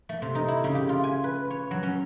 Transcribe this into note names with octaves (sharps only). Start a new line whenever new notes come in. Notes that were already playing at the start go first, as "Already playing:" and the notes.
A3
C3
D#4
E4
C#3
G4
F4
G#5
B4
C#5
F#3
C#4